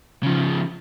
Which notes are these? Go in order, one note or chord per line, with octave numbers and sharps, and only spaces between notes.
C#3 F3